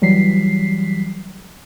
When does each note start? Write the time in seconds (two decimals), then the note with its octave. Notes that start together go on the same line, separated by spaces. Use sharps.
0.02 E3 F#3 G3 B6 C7